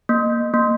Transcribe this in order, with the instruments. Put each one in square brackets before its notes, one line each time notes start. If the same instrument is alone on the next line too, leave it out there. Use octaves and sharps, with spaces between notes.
[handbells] A#3
A#3